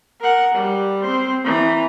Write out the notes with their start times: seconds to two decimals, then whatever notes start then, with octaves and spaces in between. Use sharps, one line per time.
0.21 A#4 F#5
0.54 G3
1.03 C4 C5
1.44 E3 A#5